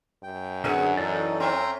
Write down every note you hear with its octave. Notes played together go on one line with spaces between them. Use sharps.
F#2 G5
D3 B3 G#4 B4 F#5
A2 E3 D#4 A4 D5
C4 C#4 E5 G5 A#5 C6